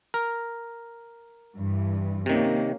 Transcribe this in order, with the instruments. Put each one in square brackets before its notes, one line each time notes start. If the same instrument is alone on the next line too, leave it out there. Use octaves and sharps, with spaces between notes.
[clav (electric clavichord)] A#4
[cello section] G2 E3
[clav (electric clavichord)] C3 D#3 [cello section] A#3 C#4